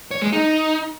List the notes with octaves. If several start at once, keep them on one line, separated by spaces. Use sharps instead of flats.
C#5
G#3
D#4